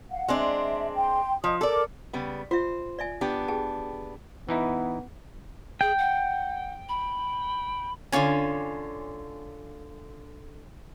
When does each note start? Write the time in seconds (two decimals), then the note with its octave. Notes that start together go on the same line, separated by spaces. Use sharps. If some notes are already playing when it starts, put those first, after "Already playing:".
0.11 F5 F#5
0.28 G#3 C4 D4 E5
0.97 G5 C6
1.44 F3 D#5 D#6
1.61 A4 A#4 D5 D6
2.13 C#3 G3 B3
2.51 F4 C5 E5
2.99 D5 E5 G#5
3.21 B3 D4 G4
3.48 G#4 G5 A5
4.49 E3 B3 D#4 E4
5.81 G#4 G5
5.98 F#5
6.89 B5
8.12 D3 C#4 F4 C#5 G#5